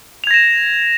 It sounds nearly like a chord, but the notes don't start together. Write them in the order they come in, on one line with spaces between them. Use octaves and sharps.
F7 G#6 A#6 E7